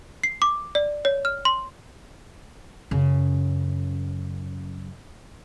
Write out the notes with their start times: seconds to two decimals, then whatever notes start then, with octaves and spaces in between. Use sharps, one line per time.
0.24 C7
0.42 D6
0.75 D5
1.05 C#5
1.25 F6
1.45 C6
2.91 F#2 C#3